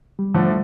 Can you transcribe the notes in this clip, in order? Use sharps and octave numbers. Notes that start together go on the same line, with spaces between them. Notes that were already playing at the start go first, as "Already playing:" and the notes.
G3
D2 D3 F3 A3